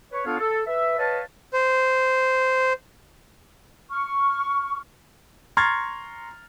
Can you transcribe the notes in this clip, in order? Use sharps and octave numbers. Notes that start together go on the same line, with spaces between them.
B4 C#5
B3 D4 F4 A4 C#5 F5
A4
B4 E5
B4 C#5 D#5 F5 A5
C5
C#6 F6
A#5 C6 C#6 F6 G#6 A6